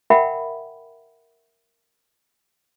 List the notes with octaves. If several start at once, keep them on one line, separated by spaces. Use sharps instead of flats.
A#4 E5 F#5 G5 B5